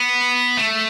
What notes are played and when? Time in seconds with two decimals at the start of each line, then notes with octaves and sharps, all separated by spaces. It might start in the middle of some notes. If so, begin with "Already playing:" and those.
Already playing: B3
0.57 A3